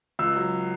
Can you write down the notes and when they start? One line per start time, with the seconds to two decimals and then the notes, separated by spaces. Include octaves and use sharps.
0.19 C#2 E6
0.36 F#3